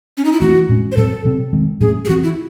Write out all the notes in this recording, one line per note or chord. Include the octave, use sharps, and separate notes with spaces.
C#4
D#4
E4
E3 A3 C4 F#4
A2 G#3 C#4
C5
A2 F#3 C4 A4
C3 F#3 C4
D#3 G#3 C4
A2 F#3 A3 C#4 G#4
G#4
E3 C4 F#4
E4